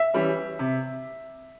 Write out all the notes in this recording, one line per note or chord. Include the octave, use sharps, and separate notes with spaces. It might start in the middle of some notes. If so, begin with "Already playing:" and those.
Already playing: E5
E3 G3 C#4
C3